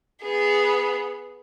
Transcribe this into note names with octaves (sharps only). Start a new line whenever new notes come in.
B3 G#4